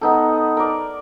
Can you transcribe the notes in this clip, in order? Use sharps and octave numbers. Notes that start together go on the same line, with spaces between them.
B3 D#4 A4
A#4 D5